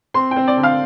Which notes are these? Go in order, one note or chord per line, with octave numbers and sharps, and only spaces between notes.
C4 C6
G5
C4
D5
D3
F5